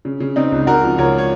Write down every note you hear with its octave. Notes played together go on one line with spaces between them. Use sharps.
C#3
C#3
C#3 C4 D#4
C#2
C#2 F#4 A#4
F3
C#2 A#4 C#5
C#5